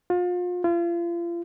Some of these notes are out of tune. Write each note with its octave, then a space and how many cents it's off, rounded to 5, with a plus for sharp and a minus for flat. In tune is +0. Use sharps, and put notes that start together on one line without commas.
F4 +35
F4 -35